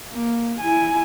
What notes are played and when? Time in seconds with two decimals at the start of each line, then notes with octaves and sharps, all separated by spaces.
0.12 A#3
0.60 E4 G#5